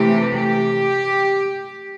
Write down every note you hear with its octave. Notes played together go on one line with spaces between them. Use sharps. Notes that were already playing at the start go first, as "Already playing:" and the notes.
Already playing: C3 E3 A3 G4
G4